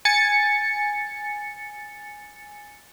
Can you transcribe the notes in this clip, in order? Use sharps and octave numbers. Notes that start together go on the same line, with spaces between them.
G#5 A6 C#7